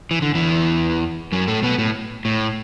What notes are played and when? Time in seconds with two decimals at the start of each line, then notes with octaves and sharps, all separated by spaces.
0.11 E3
0.22 D3
0.35 E2 E3
1.32 F#2 F#3
1.48 A2 A3
1.63 B2 B3
1.78 A2
2.25 A2